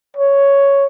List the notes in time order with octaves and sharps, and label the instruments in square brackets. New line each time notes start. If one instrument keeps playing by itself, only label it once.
[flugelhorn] C#5